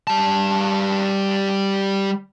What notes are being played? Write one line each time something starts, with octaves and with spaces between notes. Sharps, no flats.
G3 A5